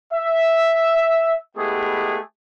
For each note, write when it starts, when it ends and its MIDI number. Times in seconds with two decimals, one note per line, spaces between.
0.13 1.36 76
1.57 2.19 56
1.57 2.19 57
1.57 2.19 59
1.57 2.19 64
1.57 2.19 67
1.57 2.19 68